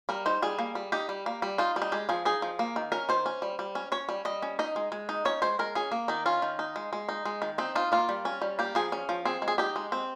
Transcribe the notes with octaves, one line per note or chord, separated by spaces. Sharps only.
G3 A#4
D#4 C5
G3 G#4
A#3
G3
D#4 G4
G3
A#3
G3
D#4 F4
G3
D#4
G#3 G4
F3 G#4
D#4 G#4
F3
A#3
D#3
C#4 A#4
D#3 C5
C#4
G3
G3
C#4
C#4 C#5
G3
G3 D#5
C#4
D#4 D#5
G#3
G#3
D#4
C#4 C#5
G#3 C5
G#3 A#4
C#4 G#4
A#3
D#3 D#4
C#4 F4
D#3
D#4
G#3
G#3
D#4
G#3
D#3
C4 D#4
D#4 F4
A#3 F4
G3
C#4
G3
A#3 G4
F3 G#4
C#4
F3
C4 G#4
G#3
G#4
D#4 G4
G#3
C4